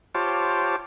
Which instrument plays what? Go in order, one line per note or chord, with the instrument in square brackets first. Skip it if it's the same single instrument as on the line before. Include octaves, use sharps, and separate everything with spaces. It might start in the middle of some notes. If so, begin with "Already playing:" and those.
[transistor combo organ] F4 G4 C5 C#5 A5 D6